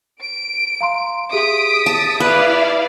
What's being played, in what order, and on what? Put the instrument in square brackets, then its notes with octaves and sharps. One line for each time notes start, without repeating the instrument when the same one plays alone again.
[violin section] D7
[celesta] F5 A#5 C6
[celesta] G4 G#4 E5 [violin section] D#6 B6 D7
[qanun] A5
[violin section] E4 D5 F5 [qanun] B4